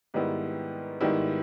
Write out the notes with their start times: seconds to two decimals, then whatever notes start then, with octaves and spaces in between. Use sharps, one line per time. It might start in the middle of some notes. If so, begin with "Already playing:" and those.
0.14 G#2 D#3 G3 B3 E4
1.01 G#2 D#3 G3 B3 E4